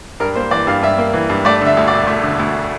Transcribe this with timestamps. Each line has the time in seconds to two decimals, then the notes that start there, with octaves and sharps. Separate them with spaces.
0.20 G2 A#4
0.35 A#3 C5
0.51 E3 D5
0.67 G2 F5
0.82 G2 E5
0.98 A#3
1.14 E3
1.30 G2
1.45 A3 D5
1.61 D3 E5
1.77 D2
1.88 D5
1.93 E1
2.07 A3
2.23 D3
2.39 D2